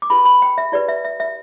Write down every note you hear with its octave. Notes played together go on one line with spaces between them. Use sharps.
D6
E4 G4 B4 B5
B5
G5
E5
E4 G4 B4 D5
E5
E5
E5